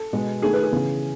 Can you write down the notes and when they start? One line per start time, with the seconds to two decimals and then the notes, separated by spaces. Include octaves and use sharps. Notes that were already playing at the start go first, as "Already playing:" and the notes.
Already playing: A4
0.13 B2 G#3 B3
0.42 D#3 A3 G#4
0.53 B4
0.63 G#4
0.72 C#3 E3 B3